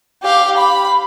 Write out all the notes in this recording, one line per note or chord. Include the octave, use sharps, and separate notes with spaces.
G4 F5
B5